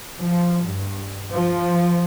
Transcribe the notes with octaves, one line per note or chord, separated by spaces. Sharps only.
F3
G2
F3